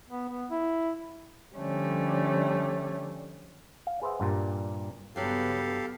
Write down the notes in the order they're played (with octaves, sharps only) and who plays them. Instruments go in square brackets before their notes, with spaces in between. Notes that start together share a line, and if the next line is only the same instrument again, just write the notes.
[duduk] B3
B3
E4
[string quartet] D3 F3 G3 A3 C#4
[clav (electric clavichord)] F5
G#4 B4 C5 E5 F#5
G2 A#2 G3
[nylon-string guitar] G2 F#3 G3 [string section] C#3 B3 [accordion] G4 A4 F5